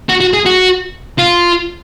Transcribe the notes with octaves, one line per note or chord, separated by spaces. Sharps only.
F#4
F#4
G#4
F#4
F4